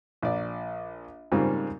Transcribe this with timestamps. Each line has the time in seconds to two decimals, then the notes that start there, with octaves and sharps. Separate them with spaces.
0.23 A#1 D5
1.32 G#2 C#3 G3 A#3 C4 F4